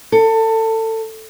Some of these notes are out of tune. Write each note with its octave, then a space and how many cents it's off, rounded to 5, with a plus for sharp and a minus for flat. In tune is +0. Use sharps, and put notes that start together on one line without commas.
A4 +25